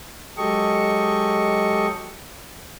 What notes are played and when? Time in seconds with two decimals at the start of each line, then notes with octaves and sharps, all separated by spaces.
0.38 F#3 G#3 G4 A4 D#5 C#6